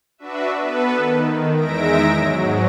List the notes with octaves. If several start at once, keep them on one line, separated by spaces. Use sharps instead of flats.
D4 F#4 B4 E5
B3 A4 B4
D#3
E2 G#3 D#4 E5 A#6 D7
G#2 F#3